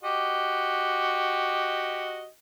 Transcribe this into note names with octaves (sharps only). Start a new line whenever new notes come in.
F#4 G4 D#5